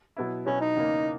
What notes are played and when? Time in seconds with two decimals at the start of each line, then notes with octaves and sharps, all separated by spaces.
0.17 B2 F#3 B3 E4
0.46 B2 F#3 B3 C#4 E4
0.61 D#4
0.76 E2 C#3 E3 A#3